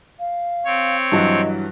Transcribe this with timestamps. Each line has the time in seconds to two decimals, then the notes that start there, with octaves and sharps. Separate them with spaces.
0.19 F5
0.65 C4 C#5
1.12 G2 E3 F#3 D#5